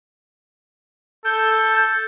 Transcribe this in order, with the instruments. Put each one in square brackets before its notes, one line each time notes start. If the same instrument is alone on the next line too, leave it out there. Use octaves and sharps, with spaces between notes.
[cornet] A4 [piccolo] G6